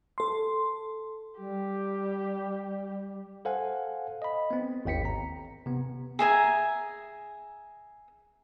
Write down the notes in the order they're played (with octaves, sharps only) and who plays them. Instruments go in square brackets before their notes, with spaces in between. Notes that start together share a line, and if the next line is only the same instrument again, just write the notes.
[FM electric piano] A4 C6
[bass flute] G3 [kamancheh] G4
[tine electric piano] A4 C5 F5 F#5 G#5
D#5 B5
B3 C4
G#1 D#2 G5 B6 C#7
A#5
C3 B3
[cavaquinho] G#4 E5 G#5 A#5